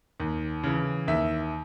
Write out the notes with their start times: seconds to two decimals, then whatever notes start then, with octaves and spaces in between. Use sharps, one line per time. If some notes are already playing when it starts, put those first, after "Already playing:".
0.20 D#2
0.63 C#3 E3
1.08 D#2 E5